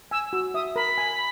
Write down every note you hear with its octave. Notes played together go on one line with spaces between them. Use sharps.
G#5 E6
F#4 E6
E5 D#6
A#4 B5
G#5